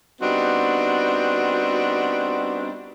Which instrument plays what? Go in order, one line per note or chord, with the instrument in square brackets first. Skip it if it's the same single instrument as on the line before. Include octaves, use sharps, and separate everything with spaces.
[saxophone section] G3 B3 C4 D4 D#4 F#4